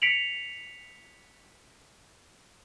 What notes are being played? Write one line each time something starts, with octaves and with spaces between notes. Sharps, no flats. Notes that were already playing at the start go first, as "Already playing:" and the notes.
B6 C#7 D7 F7 F#7